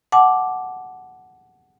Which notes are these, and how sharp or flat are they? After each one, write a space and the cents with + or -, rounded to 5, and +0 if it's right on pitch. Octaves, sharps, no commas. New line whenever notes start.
F#5 +5 A5 -30 D6 +0